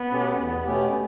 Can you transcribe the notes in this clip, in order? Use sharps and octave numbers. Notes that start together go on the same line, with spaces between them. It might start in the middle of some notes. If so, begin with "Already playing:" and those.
Already playing: B3
B2 A3 C#4 G4
E2 B3
B2 A3 C#4 G4